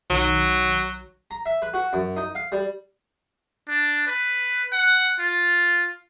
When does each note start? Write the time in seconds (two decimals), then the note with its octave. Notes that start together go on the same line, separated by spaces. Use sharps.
0.10 B1 D#3 F#3
1.31 A#5
1.46 E5
1.62 B4
1.74 F#4
1.93 F#2
2.17 D#4
2.35 F5
2.52 G3
3.68 D4
4.07 B4
4.72 F#5
5.19 F4